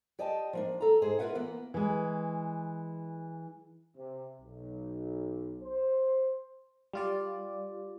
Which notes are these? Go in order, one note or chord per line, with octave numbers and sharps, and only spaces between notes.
G4 D5 D#5 G5 A5
F3 A#3 D4
A4 A#5
G#2 G#4 C5
F4 A#4 B4 E5 F#5
E3 A#3 B3
E3 G#3
C3
B1
C5
G3 F4 D5